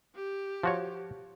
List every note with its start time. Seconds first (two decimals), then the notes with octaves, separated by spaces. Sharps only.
0.15 G4
0.63 F3 F#4 C#5